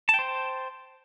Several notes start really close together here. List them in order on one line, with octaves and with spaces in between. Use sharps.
A5 G5 C5